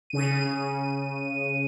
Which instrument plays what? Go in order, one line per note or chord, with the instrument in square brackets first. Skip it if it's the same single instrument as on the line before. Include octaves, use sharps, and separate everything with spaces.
[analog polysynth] C#3 D#7